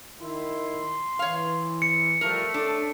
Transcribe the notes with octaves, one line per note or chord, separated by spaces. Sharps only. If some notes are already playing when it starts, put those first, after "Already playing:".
D#3 E4 C6
E3 C#5 F5
C#7
F3 G3 A3 F4 A#4
C#4 D4 A4